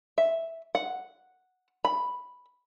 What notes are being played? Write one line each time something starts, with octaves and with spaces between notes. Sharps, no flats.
E5
F#5
B5